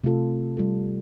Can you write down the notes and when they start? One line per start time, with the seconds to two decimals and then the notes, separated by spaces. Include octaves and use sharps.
0.04 C3 A3 F4 A4
0.57 G3 F4 A4